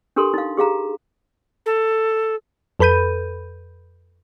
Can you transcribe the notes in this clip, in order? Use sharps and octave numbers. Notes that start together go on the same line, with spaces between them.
D4 G4 A4 A#4 C6
D#4 F5
G4 G#4 F5 A#5
A4
F2 A4 B4 B5 G6 D#7